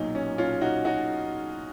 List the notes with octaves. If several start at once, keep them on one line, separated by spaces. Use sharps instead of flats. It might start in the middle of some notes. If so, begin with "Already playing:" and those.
Already playing: B1 A#2 F#3 D#4
C#4
C#4 F4
D#4 F#4
D#4 F#4